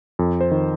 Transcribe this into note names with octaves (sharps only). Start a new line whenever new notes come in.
F2
C5
D#3